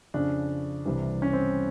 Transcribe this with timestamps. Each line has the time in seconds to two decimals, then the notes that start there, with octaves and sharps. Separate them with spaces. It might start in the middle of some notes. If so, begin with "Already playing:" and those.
0.14 F2 C#3 F3 D4
0.86 C2 C3 E3 G3
1.22 C#4
1.33 C4